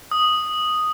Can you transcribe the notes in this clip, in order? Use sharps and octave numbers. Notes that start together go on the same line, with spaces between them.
D#6